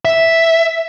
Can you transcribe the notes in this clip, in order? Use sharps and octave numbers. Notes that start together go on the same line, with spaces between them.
E5